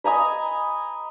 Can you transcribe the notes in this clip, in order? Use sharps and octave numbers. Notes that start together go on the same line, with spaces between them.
D#5 G#5 A#5 B5